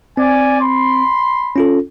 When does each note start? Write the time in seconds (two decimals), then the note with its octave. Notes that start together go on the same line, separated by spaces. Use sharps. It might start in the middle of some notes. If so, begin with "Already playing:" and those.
0.17 C4 D5 G#5
0.61 B5 C6
1.56 C#4 F4 A4